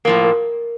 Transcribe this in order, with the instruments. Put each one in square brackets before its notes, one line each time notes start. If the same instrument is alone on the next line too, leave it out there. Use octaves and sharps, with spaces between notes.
[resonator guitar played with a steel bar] A2 F3 A#3 [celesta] A#4
[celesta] A#4